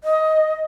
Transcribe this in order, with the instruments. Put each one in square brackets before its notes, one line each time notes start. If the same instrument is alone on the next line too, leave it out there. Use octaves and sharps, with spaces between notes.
[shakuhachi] D#5